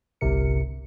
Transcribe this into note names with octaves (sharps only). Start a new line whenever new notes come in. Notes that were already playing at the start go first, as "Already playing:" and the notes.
G1 C2 C3 A#4 C#7